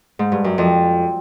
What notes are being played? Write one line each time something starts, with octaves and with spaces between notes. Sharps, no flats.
G#2
G2
F#2
F2